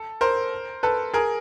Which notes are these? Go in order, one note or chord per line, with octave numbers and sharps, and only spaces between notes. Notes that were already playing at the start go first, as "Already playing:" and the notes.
Already playing: A4
A#4 C5
A4 B4
G#4 A#4